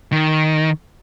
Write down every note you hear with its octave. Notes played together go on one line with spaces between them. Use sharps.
D#3